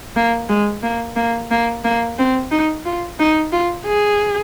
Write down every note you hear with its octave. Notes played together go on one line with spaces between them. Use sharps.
A#3
G#3
A#3
A#3
A#3
A#3
C4
D#4
F4
D#4
F4
G#4